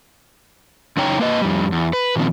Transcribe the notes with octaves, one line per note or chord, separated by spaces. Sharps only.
F#2 C#3 D#4 C#5 G5 A#5
A#3 B4 D#5
F2 G3
E2
B4
A#2 D#3 F3 C4